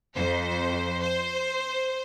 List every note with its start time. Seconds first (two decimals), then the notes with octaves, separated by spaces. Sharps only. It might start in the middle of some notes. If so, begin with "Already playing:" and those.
0.16 F2 C5
1.00 C5